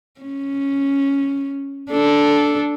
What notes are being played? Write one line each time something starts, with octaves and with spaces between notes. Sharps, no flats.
C#4
D4 A4